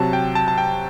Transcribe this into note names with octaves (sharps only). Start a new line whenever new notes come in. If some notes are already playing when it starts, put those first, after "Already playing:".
Already playing: C3 F#3 A5
G5
A5
A5
G5